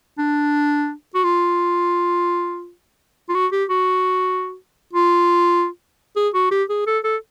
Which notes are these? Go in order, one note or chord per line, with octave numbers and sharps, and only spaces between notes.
D4
F#4
F4
F4
F#4
G4
F#4
F4
G#4
F#4
G4
G#4
A4
A4